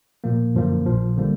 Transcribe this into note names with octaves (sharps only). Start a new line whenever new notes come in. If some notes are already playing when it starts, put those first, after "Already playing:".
A#2 F3 A#3
F#2 D3 F3 A#3
A#1 A#2 F3
D3 G3 A#3